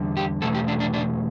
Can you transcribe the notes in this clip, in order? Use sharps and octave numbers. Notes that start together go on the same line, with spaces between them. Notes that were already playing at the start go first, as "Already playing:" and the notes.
Already playing: E2 D3 G3
G4
E2 B2 F#3 A3 A4
G4
D4
D4
D4